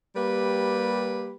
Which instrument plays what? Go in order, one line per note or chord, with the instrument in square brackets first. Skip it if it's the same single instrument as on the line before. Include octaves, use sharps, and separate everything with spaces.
[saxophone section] G3 A#3 G4 B4